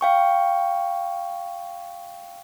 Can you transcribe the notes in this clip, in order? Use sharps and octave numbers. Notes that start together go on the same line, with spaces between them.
F5 G5 C#6